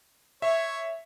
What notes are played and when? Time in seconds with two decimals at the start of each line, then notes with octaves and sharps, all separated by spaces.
0.42 C#5 E5